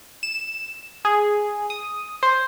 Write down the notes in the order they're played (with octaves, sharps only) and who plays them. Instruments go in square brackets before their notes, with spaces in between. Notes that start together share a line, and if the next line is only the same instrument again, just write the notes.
[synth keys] E7
G#4
D#6
C5